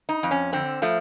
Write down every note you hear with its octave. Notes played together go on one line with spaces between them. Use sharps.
D#4
F2
C#4
D3 C4
F3 A3